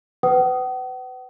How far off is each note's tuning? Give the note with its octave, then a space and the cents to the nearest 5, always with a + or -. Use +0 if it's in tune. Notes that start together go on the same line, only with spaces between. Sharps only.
B4 +30 F#5 +45 D#6 +0